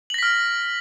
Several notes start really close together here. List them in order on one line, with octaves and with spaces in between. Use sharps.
F#7 A#6 B6 F6